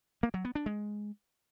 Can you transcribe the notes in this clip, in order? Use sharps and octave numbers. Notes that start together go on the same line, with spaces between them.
A#3
F#3
B3
D4
G#3